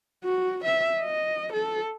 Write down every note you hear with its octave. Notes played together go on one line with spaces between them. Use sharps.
F#4
E5
D#5
A4